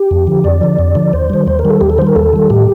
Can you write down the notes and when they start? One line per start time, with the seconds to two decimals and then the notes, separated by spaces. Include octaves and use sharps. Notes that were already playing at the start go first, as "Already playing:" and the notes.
Already playing: G4
0.11 F2
0.27 D3 F3
0.44 F2 D5
0.61 D3 F3
0.79 F2
0.95 D3 F3
1.13 D#2 C5
1.30 D#3 G3
1.46 D#2 C5
1.59 A#4
1.65 D#3 G3
1.70 A4
1.81 D#2 G4
1.90 A4
1.98 D#3 G3 C5
2.07 A#4
2.16 D#2 A4
2.33 D#3 G3
2.50 A2 G4